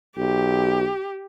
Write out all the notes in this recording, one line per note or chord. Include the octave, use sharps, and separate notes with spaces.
B1 G4